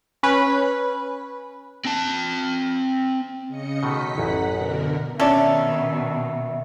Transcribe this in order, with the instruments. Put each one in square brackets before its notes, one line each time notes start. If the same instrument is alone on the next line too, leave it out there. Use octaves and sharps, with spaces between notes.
[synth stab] C#4 B4
[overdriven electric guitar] C4 A5
[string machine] C#3 D#5 C#7
[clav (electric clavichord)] B2 D#3 A3 [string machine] B6
[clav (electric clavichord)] A1 F#2 [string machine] F#5
[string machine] B2 D3 A#4
[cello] B2 D#3 [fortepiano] C#4 D4 D5 [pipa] A4 [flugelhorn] E5